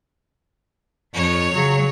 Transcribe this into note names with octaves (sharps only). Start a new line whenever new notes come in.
F2 C#5
C#3 F#3